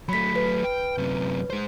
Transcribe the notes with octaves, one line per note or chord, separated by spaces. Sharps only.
F#3 A3 B5 B6
B4
G5
F#2 C3
G#3 C5